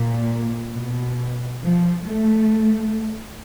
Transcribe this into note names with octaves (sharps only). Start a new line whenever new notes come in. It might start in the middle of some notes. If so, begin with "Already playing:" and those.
Already playing: A#2
B2
F3
A3